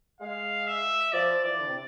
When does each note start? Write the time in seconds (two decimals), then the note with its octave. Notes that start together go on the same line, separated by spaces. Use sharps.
0.21 G#3 F5
0.67 E5
1.13 F3 D5
1.44 E3 D5
1.58 D3
1.66 C3